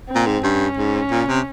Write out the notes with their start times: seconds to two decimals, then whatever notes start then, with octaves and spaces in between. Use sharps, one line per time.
0.09 C4
0.15 A#2
0.26 G#2
0.43 G2 C#4
0.77 G#2
1.11 A#2
1.28 C3